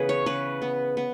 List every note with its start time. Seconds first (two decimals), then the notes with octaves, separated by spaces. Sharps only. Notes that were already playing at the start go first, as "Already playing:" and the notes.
Already playing: C#3 E3 B3 G#4 B4
0.09 C#5
0.26 C#3 B4
0.62 B3
0.97 B3